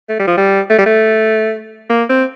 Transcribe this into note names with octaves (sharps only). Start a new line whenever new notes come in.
A3
G3
F3
G3
A3
G3
A3
A#3
C4